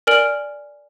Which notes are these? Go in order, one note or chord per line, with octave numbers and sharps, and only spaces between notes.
A#4 D5 G#5 F6 D7 F#7